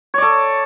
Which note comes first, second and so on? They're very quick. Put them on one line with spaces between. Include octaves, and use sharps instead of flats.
C#5 D5 A4